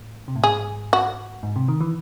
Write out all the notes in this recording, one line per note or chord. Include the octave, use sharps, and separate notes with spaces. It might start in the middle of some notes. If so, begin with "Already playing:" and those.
Already playing: A2
C3
A2
G#2 G#4
F#4
G#2
C3
D#3
E3